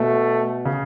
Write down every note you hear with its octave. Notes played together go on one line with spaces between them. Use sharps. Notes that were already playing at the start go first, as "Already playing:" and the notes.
Already playing: B2 A3
C#3